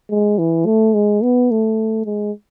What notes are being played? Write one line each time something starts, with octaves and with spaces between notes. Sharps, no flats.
G#3
E3
A3
G#3
B3
A3
G#3